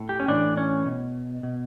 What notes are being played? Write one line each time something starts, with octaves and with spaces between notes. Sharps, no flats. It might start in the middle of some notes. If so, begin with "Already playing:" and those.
Already playing: A2
G4
C#4
A2 E3 D4
C#4
B2
B2